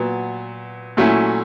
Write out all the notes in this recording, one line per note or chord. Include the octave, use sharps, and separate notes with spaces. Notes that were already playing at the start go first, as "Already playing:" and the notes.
Already playing: A#2 F#3 B3
A#2 F#3 A3 C#4 E4